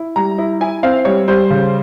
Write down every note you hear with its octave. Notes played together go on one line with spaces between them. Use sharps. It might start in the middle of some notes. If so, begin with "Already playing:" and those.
Already playing: E4
G3 A#5
E4
E4 G#5
C4 F5
G3 C#5
G3 C5
C#3